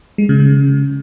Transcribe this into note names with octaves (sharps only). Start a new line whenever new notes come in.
G#3
C#3
C#3